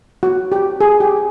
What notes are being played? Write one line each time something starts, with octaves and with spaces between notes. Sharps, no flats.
F#4
G4
G#4
G4